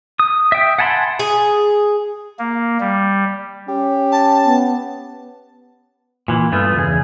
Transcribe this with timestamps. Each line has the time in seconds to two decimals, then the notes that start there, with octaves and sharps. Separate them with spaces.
0.19 D#6
0.52 E5 G5
0.79 F#5 G#5 A5 B5 C6
1.19 G#4
2.39 A#3
2.80 G3
3.68 C#4 G4
4.12 A5
4.45 B3
6.28 A#2 E3
6.52 G2 A3 B3 F4
6.76 E2 C#3 G#4